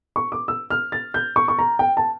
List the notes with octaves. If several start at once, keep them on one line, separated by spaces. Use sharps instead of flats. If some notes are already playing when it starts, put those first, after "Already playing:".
C#6
D6
E6
F6
A6
G6
C#6
C#6
A#5
G5
A5